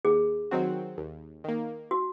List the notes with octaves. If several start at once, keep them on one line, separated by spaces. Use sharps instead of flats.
D#2 G#4
D#3 F#3 C4 F#4
D#2
D#3 A#3
F#4